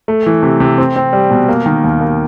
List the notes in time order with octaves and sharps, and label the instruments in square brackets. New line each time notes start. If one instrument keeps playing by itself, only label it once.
[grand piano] A3
E3
C3
C3
C4
C4
G3
B2
A#3
D#3
D#2
A#3